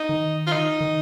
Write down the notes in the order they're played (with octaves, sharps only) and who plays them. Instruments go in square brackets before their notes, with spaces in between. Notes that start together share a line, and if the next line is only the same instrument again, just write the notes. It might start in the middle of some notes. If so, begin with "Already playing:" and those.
Already playing: [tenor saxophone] D#4
[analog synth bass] D#3
[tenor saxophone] F4
D#4
[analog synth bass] D#3